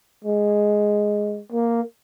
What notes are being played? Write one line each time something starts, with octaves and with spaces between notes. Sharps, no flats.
G#3
A#3